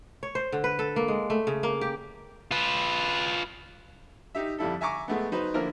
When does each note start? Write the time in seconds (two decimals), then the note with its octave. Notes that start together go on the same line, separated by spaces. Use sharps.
0.23 C#5
0.35 C5
0.52 D3
0.64 B4
0.79 A4
0.96 A#3
1.08 G#3
1.30 A3
1.47 C#3
1.63 A#3
1.81 G4
2.51 F4 B4
4.35 D#4 G4 E5
4.58 F2 G3 E4 A4
4.81 E5 G#5 A#5 C#6 D6
5.08 G#3 A3 B3
5.32 F#3 D#4 B4 C5
5.54 D3 F3 A#3 E4 A#4